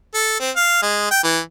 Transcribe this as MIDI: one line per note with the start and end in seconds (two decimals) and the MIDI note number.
0.14 0.35 69
0.40 0.50 60
0.56 0.82 77
0.82 1.06 56
1.11 1.23 79
1.24 1.39 52